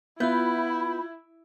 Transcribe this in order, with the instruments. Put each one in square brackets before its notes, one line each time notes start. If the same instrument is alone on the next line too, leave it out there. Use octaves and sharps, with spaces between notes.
[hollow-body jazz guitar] B3 [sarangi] E4 [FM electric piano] F4 E5 G6 [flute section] B5